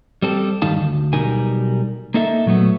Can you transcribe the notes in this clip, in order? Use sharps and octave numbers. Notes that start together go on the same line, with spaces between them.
G3 C4 A4
G2 D#3 G3 D#4 F5 A5
D2
B1 B2 G3 D#4 A#4 G#5
A#3 D#4 A4 E5
A#2 F#3 A3 B3